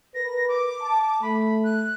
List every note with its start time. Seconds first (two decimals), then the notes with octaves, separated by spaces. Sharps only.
0.15 A#4 B4 A#6
0.48 D6
0.81 A5
1.22 A3 B5
1.64 F#6